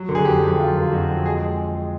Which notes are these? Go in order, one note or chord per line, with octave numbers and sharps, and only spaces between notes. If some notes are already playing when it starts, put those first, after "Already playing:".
Already playing: F#3
D3
G#4
F2 G4
F2
F#3 F4
D3
F2 F#4
F2
G#3 G#4